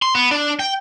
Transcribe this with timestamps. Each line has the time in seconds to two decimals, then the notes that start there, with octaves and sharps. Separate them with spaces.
0.02 C6
0.15 B3
0.31 D4
0.59 G5